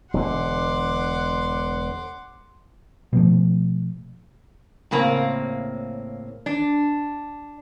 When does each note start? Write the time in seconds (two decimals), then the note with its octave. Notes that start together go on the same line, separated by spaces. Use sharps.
0.14 E1 D3 F#5 C6 D6
3.13 B2 F3 A3
4.91 A2 C#3 A#3 C4
6.46 D4